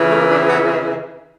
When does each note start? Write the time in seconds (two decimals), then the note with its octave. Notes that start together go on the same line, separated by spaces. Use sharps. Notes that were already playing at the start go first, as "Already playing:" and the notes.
Already playing: F2 C#3 E3
0.10 A3
0.20 A#3
0.29 D4
0.39 C4
0.49 B3